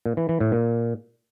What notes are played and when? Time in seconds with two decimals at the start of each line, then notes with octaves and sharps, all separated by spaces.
0.06 A#2
0.17 E3
0.29 E3
0.40 A2
0.52 A#2